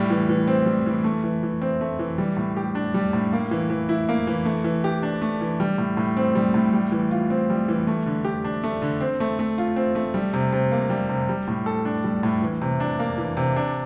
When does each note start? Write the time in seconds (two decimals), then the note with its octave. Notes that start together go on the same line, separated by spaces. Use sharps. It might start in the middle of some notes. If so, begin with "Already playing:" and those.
Already playing: A2 G3
0.10 E3
0.29 E3
0.48 C4
0.66 G3
0.86 E3
1.04 A3
1.24 E3
1.43 E3
1.62 C4
1.81 A3
1.99 E3
2.18 G3
2.37 A2
2.56 G4
2.75 D4
2.94 G3
3.13 A2
3.33 A#3
3.51 E3
3.70 E3
3.89 E4
4.09 A#3
4.27 E3
4.45 A3
4.64 E3
4.84 G4
5.03 D4
5.22 A3
5.41 E3
5.60 G3
5.78 A2
5.97 A2
6.17 C4
6.35 G3
6.54 A2
6.73 G3
6.92 E3
7.11 F4
7.30 C4
7.50 G3
7.68 E3
7.87 A3
8.06 D3
8.25 G4
8.45 D4
8.64 A3
8.82 D3
9.01 C4
9.20 A3
9.39 A3
9.58 F4
9.76 C4
9.95 A3
10.14 G3
10.34 C3
10.53 C3
10.72 A#3
10.90 G3
11.09 C3
11.29 G3
11.48 A2
11.66 A4
11.85 D4
12.04 G3
12.23 A2
12.42 E3
12.62 C3
12.80 D4
12.99 A#3
13.18 E3
13.37 C3
13.56 D4